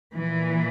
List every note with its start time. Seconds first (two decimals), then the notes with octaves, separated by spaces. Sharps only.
0.14 A#2 E3